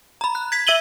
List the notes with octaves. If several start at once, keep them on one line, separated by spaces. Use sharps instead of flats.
A#5 B5
F#6
G#6 B6
E5 E6 G#6 D#7 F#7 G7